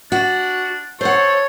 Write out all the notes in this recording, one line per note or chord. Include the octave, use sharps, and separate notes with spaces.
D4 F#4
A4 C5 C#5 F#5